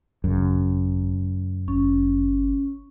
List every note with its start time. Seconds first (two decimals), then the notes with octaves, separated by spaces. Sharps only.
0.24 G#1 F#2 C#3
1.68 G1 C#4